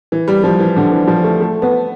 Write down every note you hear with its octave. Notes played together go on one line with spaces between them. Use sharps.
E3
G3
F3
E3
D3
E3
F3
A3
A3
B3